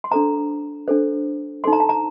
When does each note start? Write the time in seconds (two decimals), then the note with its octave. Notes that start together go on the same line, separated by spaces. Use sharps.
0.04 C6
0.11 D4 A4 C5 A#5
0.88 D4 A4 C5
1.64 D#4 A4 C5 C6
1.73 A#5
1.80 A5
1.89 A#5